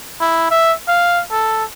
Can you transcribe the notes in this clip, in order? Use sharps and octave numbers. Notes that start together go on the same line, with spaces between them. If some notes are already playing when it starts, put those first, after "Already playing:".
E4
E5
F5
A4